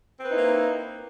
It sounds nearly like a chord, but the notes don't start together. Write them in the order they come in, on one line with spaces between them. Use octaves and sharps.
C4 B4 E4 D#4 A#3